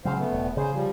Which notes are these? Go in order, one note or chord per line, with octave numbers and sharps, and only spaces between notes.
C#3 F#3 C5 F5
A3 B3
E1
C#3 G#4 C5
F3 G3